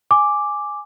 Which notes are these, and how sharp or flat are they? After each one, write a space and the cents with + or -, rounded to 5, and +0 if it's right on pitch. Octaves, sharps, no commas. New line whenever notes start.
G#5 +0 D6 +0